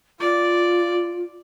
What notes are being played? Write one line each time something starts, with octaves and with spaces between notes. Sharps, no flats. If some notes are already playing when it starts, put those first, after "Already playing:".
F4 D5